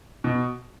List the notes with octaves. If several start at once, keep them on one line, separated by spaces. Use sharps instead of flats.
B2